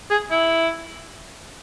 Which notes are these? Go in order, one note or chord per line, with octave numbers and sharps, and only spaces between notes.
G#4
E4